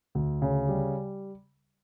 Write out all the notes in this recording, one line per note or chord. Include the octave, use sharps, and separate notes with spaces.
D2
C#3
G3